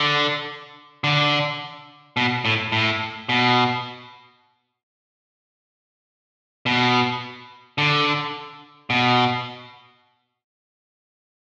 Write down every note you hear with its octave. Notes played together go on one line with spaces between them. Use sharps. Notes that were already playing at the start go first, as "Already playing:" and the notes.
Already playing: D3
D3
B2
A2
A2
B2
B2
D3
B2